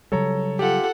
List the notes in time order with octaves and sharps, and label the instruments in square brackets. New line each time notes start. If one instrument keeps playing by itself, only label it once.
[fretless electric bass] C#3 F#3 G3 [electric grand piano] A4 C#5 A#5
[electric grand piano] F4 G4 [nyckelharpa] A4 F#5